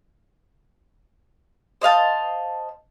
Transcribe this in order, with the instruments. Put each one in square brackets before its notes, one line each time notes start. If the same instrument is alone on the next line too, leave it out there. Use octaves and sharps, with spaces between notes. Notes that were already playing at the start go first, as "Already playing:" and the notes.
[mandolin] C5 D#5 F5 A5